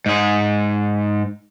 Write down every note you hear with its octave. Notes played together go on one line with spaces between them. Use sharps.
G#2 G#4